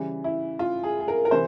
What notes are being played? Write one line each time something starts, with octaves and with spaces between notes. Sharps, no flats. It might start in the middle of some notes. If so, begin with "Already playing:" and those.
Already playing: C#3 E3 G3
E4
F4
G#4
G#4
A#4
A#4
C3 E3 C5